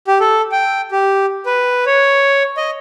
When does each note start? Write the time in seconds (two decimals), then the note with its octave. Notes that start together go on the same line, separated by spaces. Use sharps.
0.07 G4
0.20 A4
0.52 G5
0.92 G4
1.46 B4
1.86 C#5
2.57 D#5